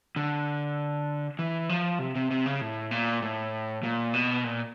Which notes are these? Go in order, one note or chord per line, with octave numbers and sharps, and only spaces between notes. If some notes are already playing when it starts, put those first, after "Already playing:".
D3
E3
F3
C3
C3
C3
C#3
A2
A#2
A2
A#2
B2
A#2